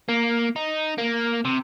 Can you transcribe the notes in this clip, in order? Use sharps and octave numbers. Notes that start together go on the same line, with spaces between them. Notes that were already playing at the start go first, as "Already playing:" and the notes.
A#3
D#4
A#3
C3